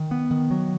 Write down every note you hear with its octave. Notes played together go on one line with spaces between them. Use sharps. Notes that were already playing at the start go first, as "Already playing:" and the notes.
Already playing: D#3
B3
D#3
F#3